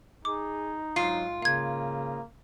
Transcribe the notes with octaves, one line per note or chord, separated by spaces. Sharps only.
D#4 G#4 D6
G#2 F#3 F4 C7
C#3 A#3 F5 G#6